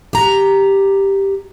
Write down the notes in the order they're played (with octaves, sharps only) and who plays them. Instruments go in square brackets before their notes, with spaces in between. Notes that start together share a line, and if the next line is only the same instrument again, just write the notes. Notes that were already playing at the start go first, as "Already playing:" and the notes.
[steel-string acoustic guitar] G4 A#5